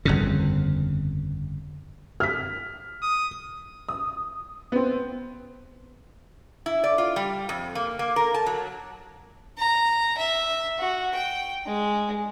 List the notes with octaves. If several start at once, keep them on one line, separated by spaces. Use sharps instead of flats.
G1 F2 C#3
F6 B6
D#6
D#6
B3 C4
E4
D5
F4
G3
F2
A#3
A#3
A#4
A5
F#3
A#5
E5
F#4
G5
G#3